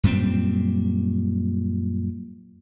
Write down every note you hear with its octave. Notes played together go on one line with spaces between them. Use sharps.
F#2 A#2 G3 C4